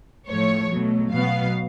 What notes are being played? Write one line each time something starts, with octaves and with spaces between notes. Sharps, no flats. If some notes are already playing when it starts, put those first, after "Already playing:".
A2 F3 A3 C#5
B2 F#3 A3
B2 F#3 B3 F5